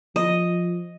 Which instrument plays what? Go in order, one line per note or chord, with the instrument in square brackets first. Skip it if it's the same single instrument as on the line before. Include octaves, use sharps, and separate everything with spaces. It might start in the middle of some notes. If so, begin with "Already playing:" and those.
[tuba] F3 [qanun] D#5